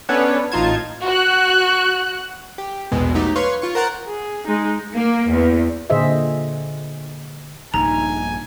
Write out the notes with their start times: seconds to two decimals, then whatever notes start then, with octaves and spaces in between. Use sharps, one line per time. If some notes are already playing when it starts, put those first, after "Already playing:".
0.09 B3 C#4 D4 A4 B4 C#5
0.52 A1 D#4 F4 A5 G#6
1.05 F#4 F#6
2.58 G4
2.91 A#1 E2 B2 G#3
3.14 F#3 A3 D#4 G4
3.36 B4 C#5 F5 C6 C#6
3.62 F4 C#6
3.75 A#4 C5 F#5 A#5 F#6 A6
4.07 G#4
4.47 G#3 D#4
4.95 A#3
5.31 E2
5.90 A#2 D3 G#4 C5 D#5 E5
7.74 A#1 G2 C3 D#4 G#5 A#5